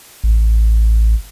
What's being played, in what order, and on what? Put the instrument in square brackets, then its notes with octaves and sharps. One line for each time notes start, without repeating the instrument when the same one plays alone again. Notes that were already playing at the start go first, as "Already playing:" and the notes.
[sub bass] A1